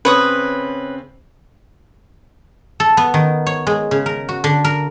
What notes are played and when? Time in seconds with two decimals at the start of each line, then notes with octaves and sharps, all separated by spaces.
0.05 C#3 C4 B4 C#5 D#6
2.80 A4
2.97 B3
3.14 D#3
3.46 C#5
3.67 G#3
3.91 C#3
4.06 A#4
4.29 F#4
4.44 D3
4.65 A#4